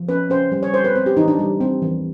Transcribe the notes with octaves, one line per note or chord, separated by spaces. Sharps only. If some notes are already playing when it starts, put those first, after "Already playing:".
Already playing: F3
C#4 B4
C#4 C5
G3
C#5
G3 C5
B4
C4 C5
G4
E3 D#4
D4
G3
C4
E3